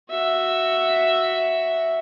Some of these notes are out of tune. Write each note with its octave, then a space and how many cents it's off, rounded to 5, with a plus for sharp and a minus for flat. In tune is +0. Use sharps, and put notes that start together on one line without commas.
F#4 +0 E5 +0